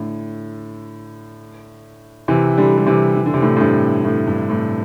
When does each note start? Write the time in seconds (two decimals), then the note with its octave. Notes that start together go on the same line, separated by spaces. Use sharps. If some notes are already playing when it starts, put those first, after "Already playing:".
Already playing: A2 D3
2.28 C3 E3
2.57 D3 G3
2.78 G3
2.86 C3 E3
3.17 E3
3.26 D3
3.34 C3
3.42 A2 D3
3.57 A2
3.60 G2 C3
4.05 A2
4.27 G2
4.49 A2